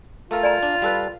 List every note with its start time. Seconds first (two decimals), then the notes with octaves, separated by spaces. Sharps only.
0.31 A3 F4 A4 A#4
0.43 D5 G#5 A#5
0.63 D4
0.82 G3 A4 B4